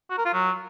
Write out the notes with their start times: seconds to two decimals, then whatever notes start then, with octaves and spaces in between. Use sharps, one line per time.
0.10 F#4
0.18 A#4
0.26 F4
0.33 F#3